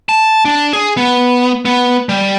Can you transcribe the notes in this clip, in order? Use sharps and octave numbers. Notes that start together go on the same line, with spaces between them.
A5
D4
G#4
B3
B3
G3